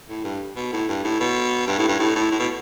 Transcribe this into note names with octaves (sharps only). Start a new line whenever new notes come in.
A2
G2
B2
A2
G2
A2
B2
G2
A2
G2
A2
A2
A2
B2